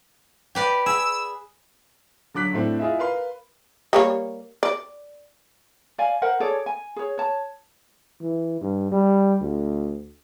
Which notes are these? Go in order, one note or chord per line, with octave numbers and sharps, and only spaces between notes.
G4 B4 D5
G#4 E6
D3 F#3 D6 F#6 B6
A2 A3 C4 D4
E4 F4 G#4 D#5 E5
A#4 B4 F5 C6
G3 A#3 C#5
D5
D5 F5 G#5
A#4 C5 F#5
G#4 A4 C#5 D5
G#5
G#4 C#5
C#5 A5
E3
G2
G3
D2